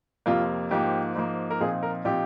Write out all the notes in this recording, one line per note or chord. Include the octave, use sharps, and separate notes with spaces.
F2 C3 F3 A#3 F4
G#2 F3 A#3 G4
G#2 F3 A#3
A#4
A#2 F3 C4 D#4 G#4
A#4
A#2 F3 C4 D#4 G4